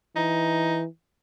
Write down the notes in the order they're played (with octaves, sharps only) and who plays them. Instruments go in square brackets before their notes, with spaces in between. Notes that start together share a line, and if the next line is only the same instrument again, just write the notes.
[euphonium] E3 [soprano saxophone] D#4